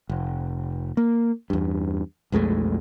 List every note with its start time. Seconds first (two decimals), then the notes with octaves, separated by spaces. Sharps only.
0.09 F1
0.97 A#3
1.50 E2 G2
2.32 B1 F2 G#3 A3